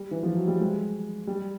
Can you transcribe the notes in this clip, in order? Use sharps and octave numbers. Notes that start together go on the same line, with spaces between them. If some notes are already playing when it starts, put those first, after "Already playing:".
Already playing: G3
E3
F3
F#3
G3
G#3
G3